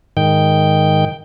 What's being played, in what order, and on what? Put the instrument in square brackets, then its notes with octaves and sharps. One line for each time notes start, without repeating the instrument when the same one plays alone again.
[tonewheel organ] G#2 D#3 G5